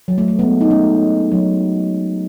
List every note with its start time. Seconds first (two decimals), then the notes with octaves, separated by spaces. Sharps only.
0.08 F#3
0.18 A3
0.28 A3
0.39 G#3 B3
0.61 D#4
0.70 A3 C#4
1.32 F#3